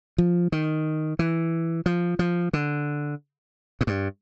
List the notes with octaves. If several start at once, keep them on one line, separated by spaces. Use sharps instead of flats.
F3
D#3
E3
F3
F3
D3
G#2
G2